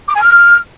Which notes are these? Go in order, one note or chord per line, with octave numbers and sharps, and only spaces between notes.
D6
G#5
F6